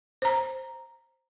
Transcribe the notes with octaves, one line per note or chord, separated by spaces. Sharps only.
C5 A#5